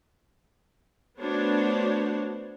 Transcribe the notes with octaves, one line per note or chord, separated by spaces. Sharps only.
A3 B3 D4 F#4 C5 C#5